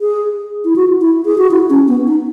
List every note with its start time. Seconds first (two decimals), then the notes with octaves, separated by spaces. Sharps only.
0.01 G#4
0.65 E4
0.76 F#4
1.01 E4
1.26 G#4
1.38 F#4
1.51 E4
1.70 C#4
1.87 B3
2.07 D#4